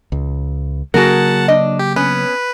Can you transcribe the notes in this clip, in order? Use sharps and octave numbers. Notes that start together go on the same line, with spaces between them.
C#2
C#3 F#3 A#3 F#4 G#4 A#4 F#5 A5
D4 D#5
G4
B3 C#4 B4